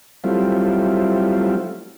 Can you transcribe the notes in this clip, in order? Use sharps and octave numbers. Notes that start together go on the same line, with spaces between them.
F#3 G3 A3 C4 E4 F4